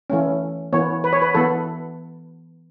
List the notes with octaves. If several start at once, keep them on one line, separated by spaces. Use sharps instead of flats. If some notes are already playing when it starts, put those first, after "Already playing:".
E3 A3 C#4
E3 B3 C#5
B4
C#5
B4
E3 B3 A4